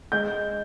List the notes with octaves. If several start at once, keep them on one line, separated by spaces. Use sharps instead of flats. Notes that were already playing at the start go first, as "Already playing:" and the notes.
G#3 G6